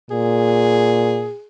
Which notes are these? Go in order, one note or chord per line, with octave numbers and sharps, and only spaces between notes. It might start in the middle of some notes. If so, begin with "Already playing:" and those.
A#2 G#4